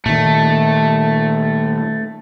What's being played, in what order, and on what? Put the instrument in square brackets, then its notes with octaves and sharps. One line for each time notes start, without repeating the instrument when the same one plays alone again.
[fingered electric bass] A#2 D#3 [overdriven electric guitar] A3